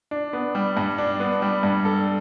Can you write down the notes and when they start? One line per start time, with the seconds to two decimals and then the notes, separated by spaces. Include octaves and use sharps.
0.11 D4
0.33 B3
0.55 G3
0.77 G2
0.98 D4
1.20 B3
1.42 G3
1.63 G2
1.85 A4